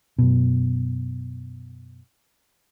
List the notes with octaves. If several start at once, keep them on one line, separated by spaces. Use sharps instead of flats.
F#2 B2